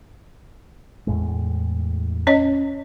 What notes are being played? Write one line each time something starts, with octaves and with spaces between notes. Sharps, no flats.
E2 A2 G#3
C#4 C#5 D#5